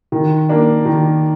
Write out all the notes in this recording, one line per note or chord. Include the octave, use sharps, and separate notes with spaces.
D#3
A#3 D4
D#3